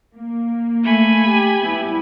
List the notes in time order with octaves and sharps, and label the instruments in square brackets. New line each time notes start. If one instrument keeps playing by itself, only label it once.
[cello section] A#3
[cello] A3 [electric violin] G#5 B5
[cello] G4
[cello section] G3 B3 E4